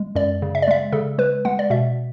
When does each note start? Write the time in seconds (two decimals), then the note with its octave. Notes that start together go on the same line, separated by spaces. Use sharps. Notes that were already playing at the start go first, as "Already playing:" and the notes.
Already playing: G#3
0.15 F#2 D5
0.42 C#3
0.55 E5
0.62 D5
0.68 G#3 E5
0.92 C#3 A4
1.18 G#3 B4
1.45 G#3 F#5
1.59 D5
1.70 B2 E5